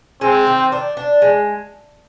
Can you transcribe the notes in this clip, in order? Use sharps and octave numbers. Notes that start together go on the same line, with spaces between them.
G#3 C4
D#3
D4
D4
G#3